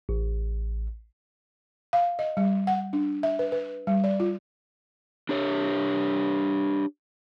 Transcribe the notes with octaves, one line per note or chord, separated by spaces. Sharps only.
A1
F5
D#5
G3
F#5
D4
E5
B4
B4
G3
D5
F4
D4 G4 C#5